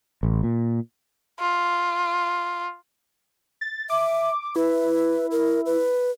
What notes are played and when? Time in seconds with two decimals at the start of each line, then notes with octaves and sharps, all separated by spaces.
0.23 A1
0.43 A#2
1.40 F4
3.61 A6
3.90 E5 D6
4.56 E4 B4
5.31 A#4
5.66 B4